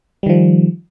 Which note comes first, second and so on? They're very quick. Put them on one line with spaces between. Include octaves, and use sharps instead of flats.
G3 D#3 F3